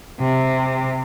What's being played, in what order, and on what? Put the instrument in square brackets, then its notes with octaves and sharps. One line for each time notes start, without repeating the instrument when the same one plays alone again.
[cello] C3